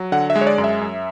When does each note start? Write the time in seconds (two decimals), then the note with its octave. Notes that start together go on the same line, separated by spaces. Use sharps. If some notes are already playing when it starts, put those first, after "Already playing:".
Already playing: F#3
0.12 D3 F#5
0.30 E5
0.36 G#3
0.41 C#5
0.47 D5
0.58 F#2
0.64 E5
0.81 F#2